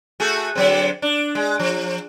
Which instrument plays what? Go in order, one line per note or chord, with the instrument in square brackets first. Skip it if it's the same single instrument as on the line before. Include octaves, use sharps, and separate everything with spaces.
[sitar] A3 F#4 G#4
D3 F#3 C4
D4
G#3
F3